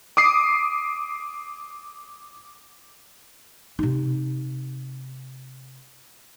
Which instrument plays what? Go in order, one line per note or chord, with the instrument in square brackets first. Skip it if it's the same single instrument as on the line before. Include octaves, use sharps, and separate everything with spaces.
[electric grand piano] D6 D#6 C7
[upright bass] C3 D#4